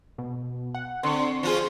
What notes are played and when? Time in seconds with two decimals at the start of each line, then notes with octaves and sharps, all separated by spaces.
0.18 B2
0.75 F#5
1.03 D3 C4 C6 C#6
1.43 F3 F4 G#4